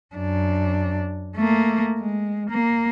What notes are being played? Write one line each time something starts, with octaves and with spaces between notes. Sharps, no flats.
F#2 D4
A3 A#3
G#3
A#3